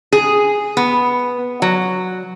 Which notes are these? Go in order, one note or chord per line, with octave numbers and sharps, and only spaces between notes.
G#4
B3
F#3